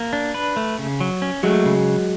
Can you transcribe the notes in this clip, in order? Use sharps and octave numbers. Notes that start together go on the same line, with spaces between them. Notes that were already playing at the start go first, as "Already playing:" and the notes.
Already playing: A#3
D4
B4
A3
C#3
F#3
C#4
F#3 G#3 A3
C#3